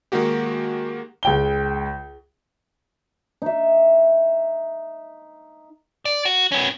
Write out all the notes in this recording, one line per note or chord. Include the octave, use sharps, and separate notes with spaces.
D#3 G#3 A#3 F#4 G4
C#2 G5 G7
D#4 E5
D5
F#4
B3 C#4